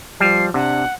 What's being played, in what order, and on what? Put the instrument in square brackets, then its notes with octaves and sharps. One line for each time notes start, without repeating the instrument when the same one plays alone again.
[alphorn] F3 [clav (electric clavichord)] G3 [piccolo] C7
[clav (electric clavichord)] C3 [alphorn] D4 [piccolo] F#5